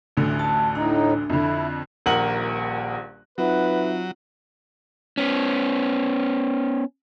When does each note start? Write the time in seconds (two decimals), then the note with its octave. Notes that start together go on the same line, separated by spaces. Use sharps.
0.17 A1 D2 D3
0.39 A5
0.75 A2 D4 D#4
1.30 F2 D3 E4
2.06 D#1 A#1 A#4 F#5 F#7
3.38 F#3 C4 D#4 F4 B4 E5 F#5
5.18 B3 C#4